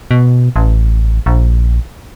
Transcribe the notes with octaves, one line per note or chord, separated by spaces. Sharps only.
B2
A1
A#1